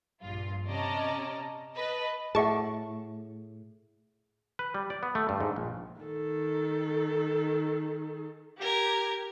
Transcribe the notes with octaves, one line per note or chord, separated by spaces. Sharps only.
A#1 G2 F4
C3 C#4 D5 D#5 A5 A#5
B4 D#5 A5
A2 G#4 E5 F#5 A5 C#6
B4
G3
D5
B3
A3
G2
G#2
A#1
D#3 A4
G4 A#4 G#6